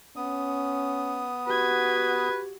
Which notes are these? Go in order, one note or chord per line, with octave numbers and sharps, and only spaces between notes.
B3 C#4 D#6
F#4 G4 B4 G#6